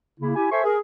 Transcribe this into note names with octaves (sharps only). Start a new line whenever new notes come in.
C#3 A#3 E4
E4 G4 G#5
A4 C5 E5 G#5 C6 C#6
G#4 A#4